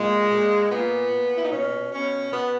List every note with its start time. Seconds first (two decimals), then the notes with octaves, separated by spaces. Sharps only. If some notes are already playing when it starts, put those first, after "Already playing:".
Already playing: A#2 G#3
0.30 A#2
0.70 A#2 B3
1.11 A#2
1.37 E4
1.43 D#4
1.51 B2 C#4
1.91 B2 C#4
2.32 B2 B3